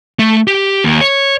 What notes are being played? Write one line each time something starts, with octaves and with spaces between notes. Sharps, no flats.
A3
G4
D#2
C#5